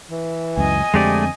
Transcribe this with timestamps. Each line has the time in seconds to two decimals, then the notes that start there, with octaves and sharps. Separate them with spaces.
0.10 E3
0.57 C#2 F#2 D#5 G#5
0.94 F2 D3 G#3 A3 C4 G4 D5